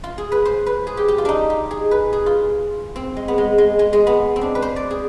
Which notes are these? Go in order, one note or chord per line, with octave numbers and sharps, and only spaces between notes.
F4
G#4
B4
C5
B4
G#4
G4
G4
F4
D4 D#4
G4
G#4
B4
G#4
F4
C4
G#3
B3
G#3
G#3
G#3
G#3
B3
C4
D4
B4
C5
D5
G#4